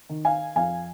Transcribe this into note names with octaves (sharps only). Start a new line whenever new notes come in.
D#3
F5 G#5
F2 F5 G#5